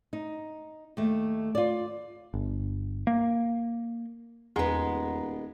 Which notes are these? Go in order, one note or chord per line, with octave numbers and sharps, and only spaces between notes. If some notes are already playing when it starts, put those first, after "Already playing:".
D#4
D#2 A3
F4 D5
G1
A#3
D#1 E2 G#3 B3 A#5